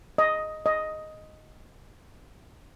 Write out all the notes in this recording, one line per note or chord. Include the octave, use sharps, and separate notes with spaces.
D#5
D#5